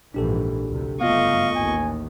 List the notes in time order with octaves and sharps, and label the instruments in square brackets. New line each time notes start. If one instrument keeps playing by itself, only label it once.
[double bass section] A#1 G#2 E3 [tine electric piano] D4 G4 A4
[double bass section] D2 C3
[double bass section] F#1 G2 A3 [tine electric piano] B3 F4 [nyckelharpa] D#5 C#6 [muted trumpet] F5
[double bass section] A1 D#2 [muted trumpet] G#5